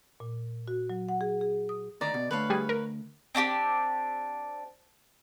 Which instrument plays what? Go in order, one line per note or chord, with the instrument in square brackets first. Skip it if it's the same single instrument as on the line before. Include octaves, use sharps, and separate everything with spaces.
[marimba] A#2
F#4
F#3
F#5
G#4
G#4
D#6
[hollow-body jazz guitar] D2 D#3 A#5 [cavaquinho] D5
[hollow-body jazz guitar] B2
[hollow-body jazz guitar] D2 A3 [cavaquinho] B4 C#5 F5
[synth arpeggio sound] G3 G#4
A#4
[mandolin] C4 D4 F#4 G4